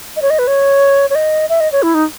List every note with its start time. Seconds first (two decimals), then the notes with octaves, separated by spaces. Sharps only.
0.16 D#5
0.22 C#5
0.30 D#5
0.39 B4
0.47 C#5
1.10 C#5
1.15 D#5
1.49 E5
1.60 D#5
1.72 C#5
1.83 E4
1.94 D#4